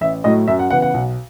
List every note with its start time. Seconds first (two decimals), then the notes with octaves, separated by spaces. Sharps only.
0.01 A1 E5
0.24 A2 F#3 A3 D#5
0.48 F#2 E5
0.59 F#5
0.70 C#3 E3 B3 F#5
0.82 F#5
0.94 B1